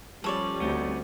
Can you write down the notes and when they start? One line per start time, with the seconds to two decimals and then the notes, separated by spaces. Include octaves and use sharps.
0.24 F3 G3 C#4 A4 B4 C#5 D5
0.60 D2 B3 C4 D#4